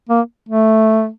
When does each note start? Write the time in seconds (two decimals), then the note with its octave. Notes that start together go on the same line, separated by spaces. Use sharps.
0.09 A#3
0.49 A3